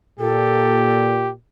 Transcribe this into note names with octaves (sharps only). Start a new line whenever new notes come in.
A#2 G4 A4